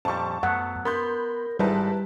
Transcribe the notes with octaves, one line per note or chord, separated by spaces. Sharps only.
F2 A#2 G3 A5 C#6
F#2 F#3 A3 B3 F#5
B3 A#4 B5 C6 G6
G#1 G#2 G3 D#4 E4 B4 A5